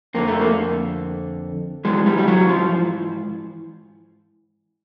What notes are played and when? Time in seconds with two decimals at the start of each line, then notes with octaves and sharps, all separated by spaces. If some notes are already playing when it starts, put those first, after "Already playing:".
0.14 F2 D3 A#3
0.28 A3
0.41 A#3
1.85 G#2 E3 G#3
2.06 G3
2.18 G3
2.28 F#3
2.49 F3